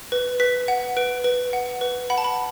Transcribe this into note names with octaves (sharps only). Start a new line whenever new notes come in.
B4
B4 B6
F#5
B4 D7
B4
F#5
B4
F#5 B5
A5
B5